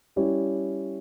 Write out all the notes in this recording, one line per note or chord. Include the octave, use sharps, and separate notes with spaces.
G3 C#4 E4 G4 C#5